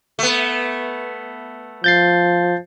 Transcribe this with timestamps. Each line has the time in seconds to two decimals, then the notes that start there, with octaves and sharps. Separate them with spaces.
0.19 A3 B3
1.84 F3 G6 A6 C7